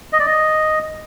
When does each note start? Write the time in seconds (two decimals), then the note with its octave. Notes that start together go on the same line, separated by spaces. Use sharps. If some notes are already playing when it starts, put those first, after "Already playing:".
0.13 D#5
0.20 D5
0.27 D#5